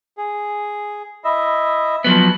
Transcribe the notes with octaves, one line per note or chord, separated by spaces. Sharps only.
G#4
E4 D#5 E5
F3 F#3 B3